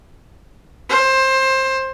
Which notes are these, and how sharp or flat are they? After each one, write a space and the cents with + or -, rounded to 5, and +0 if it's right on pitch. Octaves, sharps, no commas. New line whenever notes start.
C5 +20